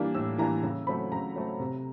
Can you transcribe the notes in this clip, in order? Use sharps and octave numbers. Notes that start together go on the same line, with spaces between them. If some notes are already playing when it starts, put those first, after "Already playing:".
Already playing: E3 G3 A#3 D4 F6
A2 E6
E3 G3 A#3 D4 A#5
C#3
F#3 A3 C4 B5
C#3 A#5
F#3 A3 C4
C3